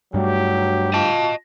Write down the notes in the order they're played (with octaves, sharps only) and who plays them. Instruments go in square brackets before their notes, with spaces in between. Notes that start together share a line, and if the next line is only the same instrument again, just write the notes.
[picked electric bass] G2 G3 A3 [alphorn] F#3 [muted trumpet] G4
[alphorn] F4 [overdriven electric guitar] D#5 A5